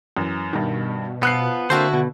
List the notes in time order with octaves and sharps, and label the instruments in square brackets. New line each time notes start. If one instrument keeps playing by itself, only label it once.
[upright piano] F#2 E3
[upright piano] G2 D#3 [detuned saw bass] B2
[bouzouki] F3 F4 [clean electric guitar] B3 [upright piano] E6 F#6 C7
[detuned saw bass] D3 [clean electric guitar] A#3 C4 C5 [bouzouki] E4 F#4 A4
[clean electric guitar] B2